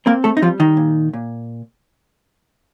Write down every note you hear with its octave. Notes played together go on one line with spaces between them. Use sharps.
A#3 C4 A#4
A3 A4
D#4
F3 G3 F4
D#3 D#4
A#2
A#2